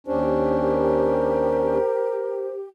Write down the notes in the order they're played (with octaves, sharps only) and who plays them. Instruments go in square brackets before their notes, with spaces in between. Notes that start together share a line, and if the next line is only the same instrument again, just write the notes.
[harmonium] D#2 C#4 D4 [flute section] G4 [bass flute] C5
[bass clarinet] A#4